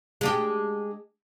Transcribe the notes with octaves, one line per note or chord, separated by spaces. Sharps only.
G#3 D4 G4